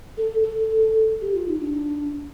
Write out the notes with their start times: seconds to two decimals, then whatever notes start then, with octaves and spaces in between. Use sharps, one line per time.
0.17 A4
0.43 A4
1.21 G4
1.34 F4
1.47 D#4
1.60 D4